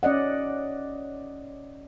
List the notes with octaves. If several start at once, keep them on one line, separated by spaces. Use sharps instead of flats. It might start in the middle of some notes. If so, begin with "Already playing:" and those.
C#4 D5 D#5 F#5